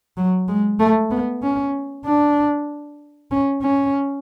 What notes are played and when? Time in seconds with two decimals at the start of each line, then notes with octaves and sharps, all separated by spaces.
0.17 F#3
0.48 G#3
0.80 A3
1.11 B3
1.42 C#4
2.05 D4
3.31 C#4
3.62 C#4